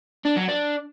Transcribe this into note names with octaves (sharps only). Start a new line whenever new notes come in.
D4
F#3
D4